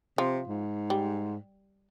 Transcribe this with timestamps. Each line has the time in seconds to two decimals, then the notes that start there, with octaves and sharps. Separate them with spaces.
0.18 C3 F3
0.47 G#2
0.90 G3